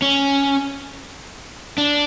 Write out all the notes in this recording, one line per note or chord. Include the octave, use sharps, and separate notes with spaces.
C#4
D4